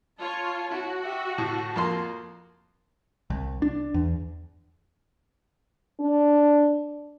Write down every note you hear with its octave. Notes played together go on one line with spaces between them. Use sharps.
F4 C#5 A5
E4 F#4
G4 E5
A2 A5
F2 A#3 C6
C2
D4
E2
D4